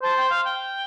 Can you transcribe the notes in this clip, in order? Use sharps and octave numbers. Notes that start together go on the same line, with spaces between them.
C5 A5
G5
F5
G5